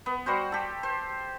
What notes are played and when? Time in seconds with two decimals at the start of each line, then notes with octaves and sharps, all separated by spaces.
0.06 B3
0.26 G3 F#4 C5
0.52 G4 A4
0.83 C5